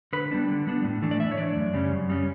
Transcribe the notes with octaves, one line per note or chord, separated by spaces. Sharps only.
D3 B4
G3 B3 D4
D3
G3 B3 D4
A2
E3 A3 D4
D5
A2 E5
C#5
E3 A3 D4 D5
F#2
C#3 G3 C#4
F#2
C#3 G3 C#4